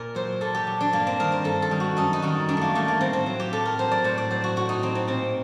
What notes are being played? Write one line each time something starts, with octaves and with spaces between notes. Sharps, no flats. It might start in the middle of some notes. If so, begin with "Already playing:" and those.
Already playing: A#2 A#4
F#3 C5
A#2 A4
G4
F#3
D4
G2 A#3
C4
D#3 G3 A#4
C5
G2 A4
A4
D#3 G3
F#4
F#2 D#4
D#4
D#3 G3 F#4
F#2 D4
A3 A#3
D#3 G3 A3
A#3
A2 C4
C4
F#3
G4
A2 A4
A#4
F#3 C5
D5
A2 C5
D5
F#3 C5
F#4
A2 F#4
D#4
F#3 C4
C4
A#2 C4